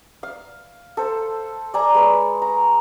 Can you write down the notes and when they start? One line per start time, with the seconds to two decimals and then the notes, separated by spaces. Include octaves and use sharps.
0.23 F5
0.97 A4 C5
1.74 D5 G#5 A#5
1.94 G#3 B4 C#5
2.42 A#5